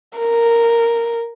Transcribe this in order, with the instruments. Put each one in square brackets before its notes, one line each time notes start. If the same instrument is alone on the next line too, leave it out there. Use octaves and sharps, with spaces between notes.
[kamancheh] A#4